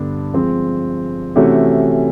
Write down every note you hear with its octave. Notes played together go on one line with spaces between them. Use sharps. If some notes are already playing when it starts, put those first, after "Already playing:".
Already playing: G2 D3 G3 B3 D4
F3 G#3 C4
C3 E3 A3 C#4 F#4